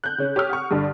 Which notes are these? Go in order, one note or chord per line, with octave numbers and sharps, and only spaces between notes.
F#6 G6
C#3 C#4
G4 C#5 D#6 F6
F#5 C#6
G2 D3 D4